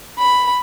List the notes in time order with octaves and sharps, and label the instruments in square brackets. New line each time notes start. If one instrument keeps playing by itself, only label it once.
[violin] B5